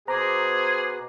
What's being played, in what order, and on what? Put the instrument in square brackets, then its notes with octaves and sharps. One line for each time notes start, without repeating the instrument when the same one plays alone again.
[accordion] B2 B3 F#6 [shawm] G#4 [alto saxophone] C5 [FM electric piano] A#5 D6